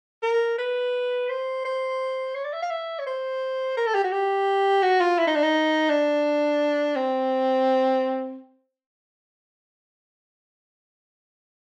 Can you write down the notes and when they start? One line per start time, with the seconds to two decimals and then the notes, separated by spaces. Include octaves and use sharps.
0.23 A#4
0.58 B4
1.29 C5
1.65 C5
2.35 C#5
2.44 D5
2.53 E5
2.62 F5
2.71 E5
2.99 C#5
3.06 C5
3.77 A#4
3.86 A4
3.94 G4
4.04 F#4
4.12 G4
4.82 F#4
5.00 F4
5.19 E4
5.27 D#4
5.35 D4
5.43 D#4
5.89 D4
6.96 C4